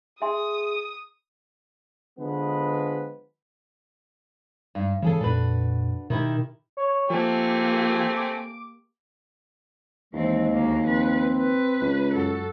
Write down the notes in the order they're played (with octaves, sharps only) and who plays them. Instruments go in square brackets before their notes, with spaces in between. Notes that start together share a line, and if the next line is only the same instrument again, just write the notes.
[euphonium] G#4 [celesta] E5 G#5 C6 [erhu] D#6
[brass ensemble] D3 F3 G#3 B3 B4
[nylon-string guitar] G2
[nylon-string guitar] C#3 G#4 A4 [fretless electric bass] E3 F3 G#3
[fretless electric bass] F2 A#2 [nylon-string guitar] D4 F#4 B4
[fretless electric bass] B2 [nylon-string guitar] D#3 E4 G4
[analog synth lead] C#5
[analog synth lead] F3 [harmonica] A3 C4 G#5 [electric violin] A#3 G4
[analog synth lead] D6
[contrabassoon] D#2 [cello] E3 C4 [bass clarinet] G#3
[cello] D2 A#3
[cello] F3 B4 [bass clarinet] C4
[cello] B4
[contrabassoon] C#2
[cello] F#2 A4 [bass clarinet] F#4